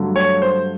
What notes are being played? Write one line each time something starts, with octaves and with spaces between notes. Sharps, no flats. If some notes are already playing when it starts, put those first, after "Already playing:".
Already playing: G2 D3 F#3 A3
C#5
C5